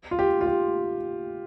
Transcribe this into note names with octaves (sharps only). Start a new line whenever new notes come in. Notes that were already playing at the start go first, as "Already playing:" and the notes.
F4
G4
F4
G4